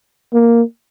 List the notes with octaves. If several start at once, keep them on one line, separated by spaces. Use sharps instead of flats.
A#3